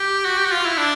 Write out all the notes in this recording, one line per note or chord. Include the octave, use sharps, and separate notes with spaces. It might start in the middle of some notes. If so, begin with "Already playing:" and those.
Already playing: G4
F#4
G4
F#4
F4
E4
D4